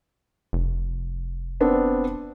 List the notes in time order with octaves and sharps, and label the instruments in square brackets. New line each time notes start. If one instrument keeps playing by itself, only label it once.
[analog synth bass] F1
[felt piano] B3 C4 D4